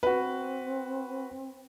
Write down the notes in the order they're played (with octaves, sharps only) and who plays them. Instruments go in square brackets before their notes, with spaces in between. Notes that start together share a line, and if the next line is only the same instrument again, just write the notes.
[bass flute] C4 [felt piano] F#4 B4